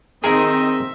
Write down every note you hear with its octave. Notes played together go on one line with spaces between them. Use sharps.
D#3 C4 G#4 A#4 D#5 E5 G#5